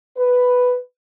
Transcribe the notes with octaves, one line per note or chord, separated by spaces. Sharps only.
B4